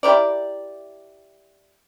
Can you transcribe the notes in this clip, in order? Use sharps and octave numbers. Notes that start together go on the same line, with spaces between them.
E4 G4 A#4 D5